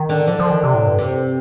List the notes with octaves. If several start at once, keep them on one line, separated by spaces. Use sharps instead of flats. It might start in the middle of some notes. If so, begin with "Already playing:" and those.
Already playing: D#3
D3
D3 F3
F3
D#3
C3
A2
G2
C3